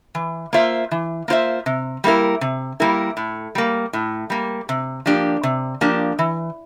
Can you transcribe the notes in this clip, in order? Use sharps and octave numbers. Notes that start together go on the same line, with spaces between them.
E3
A#3 F4 C5 E5
E3
A#3 F4 C5 E5
C3
G3 A#3 E4 A#4
C3
G3 A#3 E4 A#4
A2
G3 A#3
A2
G3 A#3
C3
F3 A#3 D4 G4
C3
F3 A#3 D4 G4
E3